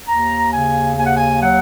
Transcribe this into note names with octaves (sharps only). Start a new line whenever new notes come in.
D#2 A#5
C#3 G#5
D#2 G#5
F#5
G#5
F#3 F#5